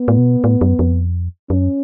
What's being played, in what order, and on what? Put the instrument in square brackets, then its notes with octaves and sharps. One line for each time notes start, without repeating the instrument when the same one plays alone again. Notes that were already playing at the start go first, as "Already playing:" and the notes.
Already playing: [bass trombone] B3
[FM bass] A2
B2
A2
F#2
F2
[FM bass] F#2 [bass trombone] C#4